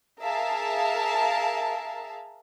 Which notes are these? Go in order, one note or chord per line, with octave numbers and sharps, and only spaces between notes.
G#4 A#4 E5 F5 A5